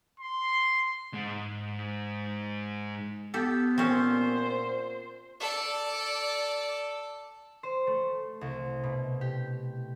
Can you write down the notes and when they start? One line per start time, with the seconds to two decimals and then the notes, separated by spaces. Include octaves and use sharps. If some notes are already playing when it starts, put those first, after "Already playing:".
0.20 C6
1.14 G#2 G#3
3.34 B3 G4 A4
3.78 A#2 C4 C#4 C5
5.40 A4 D5
7.63 C5
7.87 A3
8.41 C2
8.83 B2
9.21 G4